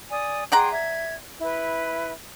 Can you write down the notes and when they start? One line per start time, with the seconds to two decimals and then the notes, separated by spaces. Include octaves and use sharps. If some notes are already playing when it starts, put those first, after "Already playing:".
0.10 D5 G#5 D#6
0.52 G#4 D5 F#5 G5 A#5 C6
0.72 E5 G#6
1.41 E4 B4